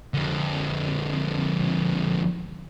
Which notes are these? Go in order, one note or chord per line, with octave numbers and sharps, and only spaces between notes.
F2 D3